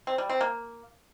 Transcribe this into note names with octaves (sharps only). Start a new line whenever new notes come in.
C4
G3
C4
A#3